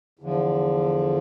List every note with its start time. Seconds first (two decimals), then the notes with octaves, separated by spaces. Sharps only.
0.19 E2 D3 F3